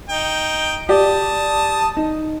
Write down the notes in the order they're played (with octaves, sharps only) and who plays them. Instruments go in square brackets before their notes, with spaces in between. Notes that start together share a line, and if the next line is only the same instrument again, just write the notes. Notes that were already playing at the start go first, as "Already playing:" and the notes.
[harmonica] D#4 G5
[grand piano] G4 D5 [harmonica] A5 D#6
[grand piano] D#4